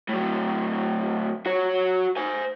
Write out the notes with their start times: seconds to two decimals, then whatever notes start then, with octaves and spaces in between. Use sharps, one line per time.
0.09 A2 F#3
1.46 F#4 C#5
2.17 C5 G#5